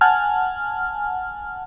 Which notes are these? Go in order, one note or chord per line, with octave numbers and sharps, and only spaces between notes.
F#5 G#5 A5 F6